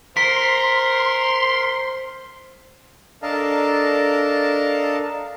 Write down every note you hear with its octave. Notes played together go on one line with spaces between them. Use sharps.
A#4 C5 C6 B6
D4 A4 A#4 D#5 F5 A5